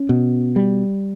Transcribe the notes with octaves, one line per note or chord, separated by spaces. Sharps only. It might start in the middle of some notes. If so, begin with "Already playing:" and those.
Already playing: C#4
B2
G3